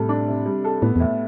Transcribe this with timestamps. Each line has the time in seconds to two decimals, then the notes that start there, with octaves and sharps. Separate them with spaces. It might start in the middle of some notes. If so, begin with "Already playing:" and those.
Already playing: A2 C3 G3 A4
0.09 D4
0.27 C3
0.46 G3
0.65 A4
0.82 A2 B3
0.96 E2 A2